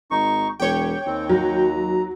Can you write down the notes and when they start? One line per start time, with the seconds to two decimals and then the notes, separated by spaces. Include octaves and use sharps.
0.11 G#1 D#4 C#6
0.60 E1 G4 C#5 G5
1.06 D#2 C4
1.29 F#3 A#5